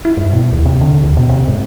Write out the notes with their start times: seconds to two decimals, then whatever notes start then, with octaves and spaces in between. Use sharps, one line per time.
0.05 E4
0.17 G2
0.33 B2
0.53 D#2
0.66 C3
0.81 D3
1.03 D#2
1.17 B2
1.29 C3
1.48 G#2